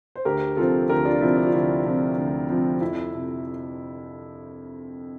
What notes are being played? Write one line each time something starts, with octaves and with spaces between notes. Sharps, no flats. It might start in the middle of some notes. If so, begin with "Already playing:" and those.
C5
D2 G4 A#4
C3 F3 C4 F4 A4
D2 G4 A#4
D4 F4
C3 F3 C4 E4
D4
F4
D2 E4
C3 F3 C4
D2
C3 F3 C4
F2 E4
C3